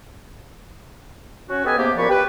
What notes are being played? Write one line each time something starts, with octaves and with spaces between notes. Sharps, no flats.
C#4 F#4
B3 G4 A4 B4 D#5 G#5
G#2 C3 A#3 B3 G4
F#2 A#2 F3 D5 B5 C#6
G4 B4